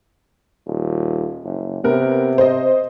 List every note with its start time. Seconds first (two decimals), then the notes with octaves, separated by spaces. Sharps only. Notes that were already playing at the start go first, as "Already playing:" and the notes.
0.67 D#1
1.44 F#1
1.84 C3 B3 A#4
2.38 C5 D#5